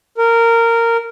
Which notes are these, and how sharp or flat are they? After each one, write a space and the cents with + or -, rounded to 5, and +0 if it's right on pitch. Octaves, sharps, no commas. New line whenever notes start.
A#4 -15